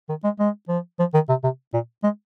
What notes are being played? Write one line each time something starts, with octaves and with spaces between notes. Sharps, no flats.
D#3
G#3
G#3
F3
F3
D#3
C3
C3
A#2
G#3